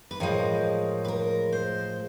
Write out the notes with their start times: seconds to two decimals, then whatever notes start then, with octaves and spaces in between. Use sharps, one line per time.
0.11 B4
0.20 A2 F3 G#3 A#4
1.05 B4
1.08 A#4
1.52 C5